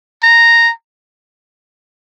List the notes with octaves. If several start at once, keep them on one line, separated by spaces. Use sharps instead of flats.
A#5